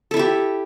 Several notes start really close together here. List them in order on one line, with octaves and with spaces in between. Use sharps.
A4 E4 E5 G4